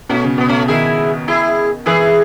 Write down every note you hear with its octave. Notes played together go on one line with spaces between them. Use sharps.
B2 A3 C#4
C#3
B2 B3
A3 C#4
D#3 E4 G#4
E4 G#4
E3 E4 G#4